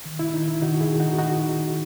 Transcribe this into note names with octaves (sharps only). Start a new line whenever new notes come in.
D#3
E4
D#3 D#4
E4
D#3 D#4 F#4
E4 G#4
D#3
D#4 F#4
D#3 D#4 F#4